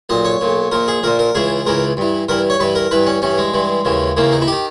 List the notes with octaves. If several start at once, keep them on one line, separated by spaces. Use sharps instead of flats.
B1 A#2 D#5
C#5
B1 A#2
A#1 A#2 A#4
G#4
A#1 A#2 A#4
A#4
C#2 C#3 E3 G#4
C#2 C#3 E3 A#4
G2 E3
G2 E3 A#4
C#5
G2 E3 B4
A#4
G2 E3 B4
C#4
G2 E3 C#4
G#3
G2 E3
D#2 C#3 E3
D#2 C#3 E3 A#3
D#4
E4
D#3 G4